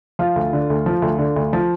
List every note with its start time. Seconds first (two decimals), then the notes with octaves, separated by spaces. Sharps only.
0.19 F3 F4
0.36 D2
0.53 D3
0.70 D2
0.86 F3
1.02 D2
1.19 D3
1.36 D2
1.53 F3